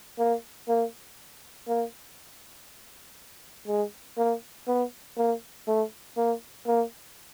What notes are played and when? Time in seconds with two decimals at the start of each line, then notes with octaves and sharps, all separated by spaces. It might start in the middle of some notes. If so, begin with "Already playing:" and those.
0.19 A#3
0.69 A#3
1.68 A#3
3.68 G#3
4.18 A#3
4.68 B3
5.17 A#3
5.68 A3
6.17 A#3
6.67 A#3